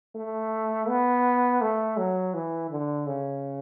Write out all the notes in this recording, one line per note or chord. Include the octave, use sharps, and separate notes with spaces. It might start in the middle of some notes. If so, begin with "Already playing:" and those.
A3
B3
A3
F#3
E3
D3
C#3